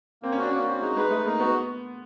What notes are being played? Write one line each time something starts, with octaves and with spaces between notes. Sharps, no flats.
A#3 C4
C#4
D4 F#4
A#3 C#4
C4 F#4
G#3 D#4
G#3 B4
A3 D#4
A#3 D#4
B3 F#4